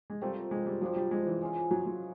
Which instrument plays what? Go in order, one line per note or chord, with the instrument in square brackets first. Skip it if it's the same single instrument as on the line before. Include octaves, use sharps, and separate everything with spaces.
[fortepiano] G#3
[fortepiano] G3 [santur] A3 C4 F4 A#4
[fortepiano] G#3
G3
[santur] F3 A#3 D4 [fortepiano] F#3
[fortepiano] G3
G#3
E3
[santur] G#3 C#4 F4
[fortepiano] F#3
F#3